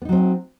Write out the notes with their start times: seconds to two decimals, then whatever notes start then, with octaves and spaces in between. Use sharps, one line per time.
0.02 B3
0.05 D#4
0.09 F#3
0.12 C4